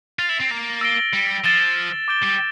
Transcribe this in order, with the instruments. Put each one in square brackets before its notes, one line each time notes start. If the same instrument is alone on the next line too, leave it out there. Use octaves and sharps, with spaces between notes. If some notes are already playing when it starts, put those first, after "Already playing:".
[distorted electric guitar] F4 [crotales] A6 C7 F7
[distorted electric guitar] E4
C4
A#3
[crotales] E6 A#6 D7 G7
[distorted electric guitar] G3
[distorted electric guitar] F3 [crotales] A6 E7 G7
[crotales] D6 G6 D7 G7
[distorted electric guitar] G3